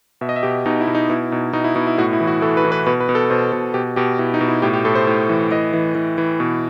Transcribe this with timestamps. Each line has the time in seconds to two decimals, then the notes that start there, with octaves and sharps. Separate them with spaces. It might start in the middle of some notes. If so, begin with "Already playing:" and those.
0.21 B2 E5
0.29 D#5
0.36 E5
0.43 B2 G4
0.66 B2 D#4
0.81 E4
0.87 B2
0.95 D#4
1.10 B2 E4
1.32 B2 D#4
1.53 B2 D#4
1.64 E4
1.75 B2 E4
1.87 E4
1.98 A2 F#4
2.13 E4
2.20 E3
2.27 F#4
2.42 E3 A4
2.57 B4
2.65 E3
2.72 B4
2.86 B2 B4
3.00 B4
3.09 B2
3.15 A4
3.30 B2 C5
3.52 B2 A4
3.74 B2 G4
3.96 B2 G4
4.19 B2 E4
4.34 D#4
4.41 B2
4.49 E4
4.62 A2 G4
4.73 G4
4.85 A2 A4
4.95 C5
5.07 A2
5.29 E3
5.51 E3 D#5
5.73 E3
5.95 E3
6.18 E3
6.40 B2